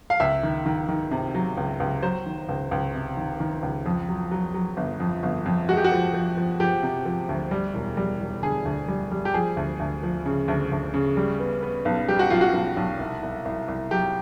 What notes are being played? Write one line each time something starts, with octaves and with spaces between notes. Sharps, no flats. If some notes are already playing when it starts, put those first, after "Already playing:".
F5
C#2 E5
D#3
D#3
D#3
C3
F#3
C#2
C#2
F#3 C5
D#3
C#2
C#2
C3
D#3
D#3
C#2
F2
F#3
F#3
F#3
G1
F2
G1
F2
G#3 F#4
G4
F#4
F3
F3
F3
F3 G4
C3
F3
D2
G3
E1
G3
E1
D3 G#4
D2
G3
G3
G4
F3 G#4
D2
D2
F3
C#3
D2
D2
C#3
G3
B3
B3
B1
G3 G4
F#4
B1 F4
F#4
B1
B1
C2
C2
C2
C2
F#3 G4